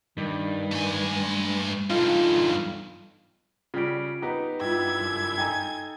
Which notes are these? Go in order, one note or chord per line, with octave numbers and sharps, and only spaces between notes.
G2 D#3
A3 G#5
E2 G2 D#4 F4 A4
C#3 G3 F4 D7
B3 D#4 G4
G2 E4 F4 G5 G#6
F#1
D#4 A4 G5 G#5